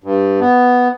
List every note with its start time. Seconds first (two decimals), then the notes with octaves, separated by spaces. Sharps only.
0.04 G2
0.40 B3